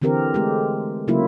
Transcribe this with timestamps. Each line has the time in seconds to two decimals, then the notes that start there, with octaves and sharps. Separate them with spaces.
0.02 D3 E3 C4 G4 A#4
0.34 G#3 A3 G4
1.08 C#3 F#3 A#3 E4 F4